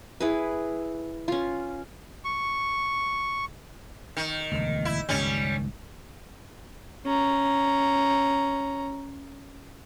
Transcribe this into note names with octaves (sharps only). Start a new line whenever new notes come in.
E4 G#4 B4
C#4 F4
C#6
D#3
E1 D2
E4
C#2 G2 D#3 G3 C#4
C#4 A#5